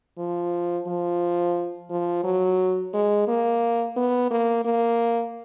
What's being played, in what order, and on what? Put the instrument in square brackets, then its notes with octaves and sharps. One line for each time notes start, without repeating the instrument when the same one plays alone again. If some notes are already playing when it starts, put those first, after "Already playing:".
[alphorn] F3
F3
F3
F#3
G#3
A#3
B3
A#3
A#3